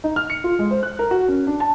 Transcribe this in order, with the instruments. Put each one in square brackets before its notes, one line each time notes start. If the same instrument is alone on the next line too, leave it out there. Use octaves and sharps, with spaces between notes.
[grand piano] D#4
F6
C#7
F4
G#3
C5
F#6
A#4
F#4
C#4
D4
A5